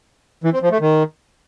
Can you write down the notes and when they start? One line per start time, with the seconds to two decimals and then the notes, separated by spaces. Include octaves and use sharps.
0.44 E3
0.53 C4
0.62 F3
0.71 A3
0.80 D#3